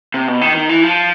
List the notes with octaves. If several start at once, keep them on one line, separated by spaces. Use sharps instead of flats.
C3
B2
D#3
D#3
E3
F3